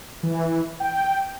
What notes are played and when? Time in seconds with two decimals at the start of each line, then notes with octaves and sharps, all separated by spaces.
0.23 E3
0.80 G5